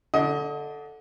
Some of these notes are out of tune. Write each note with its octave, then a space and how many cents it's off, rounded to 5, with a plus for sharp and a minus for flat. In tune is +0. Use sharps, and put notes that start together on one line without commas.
D3 -5 D#5 +30